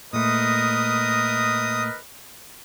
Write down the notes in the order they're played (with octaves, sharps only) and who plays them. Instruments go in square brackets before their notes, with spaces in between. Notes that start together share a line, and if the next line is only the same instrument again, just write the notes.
[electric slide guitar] A#2 A3 [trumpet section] A#4 B4 D#5 [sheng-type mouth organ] D#6